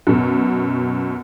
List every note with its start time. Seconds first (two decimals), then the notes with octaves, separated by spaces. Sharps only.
0.07 F#2 B2